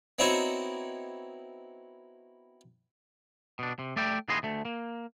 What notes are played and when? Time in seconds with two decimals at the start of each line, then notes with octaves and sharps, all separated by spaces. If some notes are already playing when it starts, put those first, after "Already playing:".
0.19 B3 C4 D#4 E4 F#4 C#5
3.59 B2 D4
3.79 C3
3.96 A3 D5 E5 G5
4.28 D#2 B3 E4 G#4 D#5 C6
4.43 D2 A3
4.65 A#3